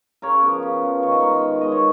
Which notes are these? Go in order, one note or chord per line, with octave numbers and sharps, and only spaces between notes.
C#3 A#4 C#5
F3 B3
C#3
F3 B3
D#3 C#5
D#5
G#3 B3 A#4 C#5
D#3
G#3 B3 D#5
C#5